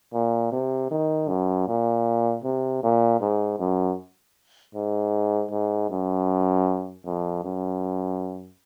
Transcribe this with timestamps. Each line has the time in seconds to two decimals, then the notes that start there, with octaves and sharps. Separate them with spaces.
0.13 A#2
0.52 C3
0.91 D#3
1.29 F#2
1.68 A#2
2.44 C3
2.83 A#2
3.21 G#2
3.59 F#2
4.75 G#2
5.51 G#2
5.90 F#2
7.06 F2
7.44 F#2